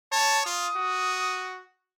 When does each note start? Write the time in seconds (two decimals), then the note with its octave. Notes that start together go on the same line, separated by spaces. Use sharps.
0.12 C#5 A5
0.46 F4 D#6
0.75 F#4